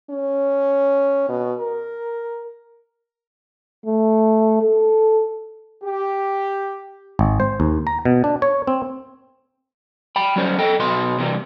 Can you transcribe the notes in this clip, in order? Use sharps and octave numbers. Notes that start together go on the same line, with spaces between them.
C#4
B2
A#4
A3
A4
G4
G#1
C5
D#2
A#5
B2
D4
C#5
C4
G5 B5
F#3 G3 C#4 C5
A4 D#5 G5
B1 B2 B3 B4 D#5 C6
C3 E3 G3